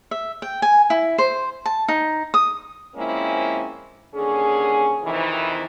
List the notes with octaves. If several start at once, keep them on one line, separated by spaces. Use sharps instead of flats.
E5
G5
G#5
E4
C5
A5
D#4
D#6
F3 G#3 A#3 C4 C#4 E4
D#2 D3 C#4 G#4
F2 C3 D#3 E3